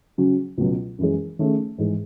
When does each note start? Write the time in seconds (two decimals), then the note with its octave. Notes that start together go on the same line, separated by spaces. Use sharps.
0.18 C#3 F#3 C#4 F#4
0.57 C#2 B2 F#3
0.98 F#2 E3 G#3
1.39 D#3 A3 C#4 G#4
1.78 G#2 E3 G#3